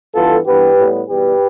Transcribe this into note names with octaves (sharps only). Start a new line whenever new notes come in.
G2 E3 B3 F4 A4
G2 E3 B3 G4 B4
A2 G3 B3
E2 B2 G3 G4 B4